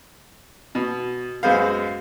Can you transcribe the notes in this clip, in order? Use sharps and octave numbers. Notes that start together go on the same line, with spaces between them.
B2
F#2 G#3 B3 F#4 C5 F5